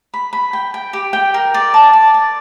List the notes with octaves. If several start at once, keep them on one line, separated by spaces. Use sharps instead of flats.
B5
B5
G5
G5
G4
G5
A#4
D5
A5
D5
D5